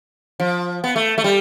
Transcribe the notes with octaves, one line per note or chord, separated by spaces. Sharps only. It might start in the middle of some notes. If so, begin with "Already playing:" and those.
F3
B3
A3
A3
G3